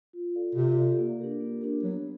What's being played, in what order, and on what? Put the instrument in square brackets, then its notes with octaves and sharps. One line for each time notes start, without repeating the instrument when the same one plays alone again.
[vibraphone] F4
A4 D5 F5
[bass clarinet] C3 [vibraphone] F4
[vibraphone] A4 D5 F5
A#3
D4 G4 A#4
A#3
D4 G4 A#4
[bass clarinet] F#3 [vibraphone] B3